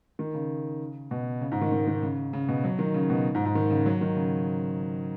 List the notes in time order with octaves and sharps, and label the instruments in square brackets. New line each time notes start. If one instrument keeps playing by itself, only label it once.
[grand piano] D#3
C#3
B2
C#3
G#2
D#3
D#3
D#3
C#3
C#3
B2
F#3
D#3
C#3
B2
G#2
G#2
D#3
C#3
F#3
D#3
C#3